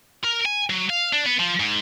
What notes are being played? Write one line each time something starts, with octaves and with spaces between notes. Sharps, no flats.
A#4
G#5
F#3
F5
D4
B3
F3
G#2